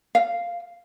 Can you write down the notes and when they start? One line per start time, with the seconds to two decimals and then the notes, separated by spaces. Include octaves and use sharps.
0.15 F5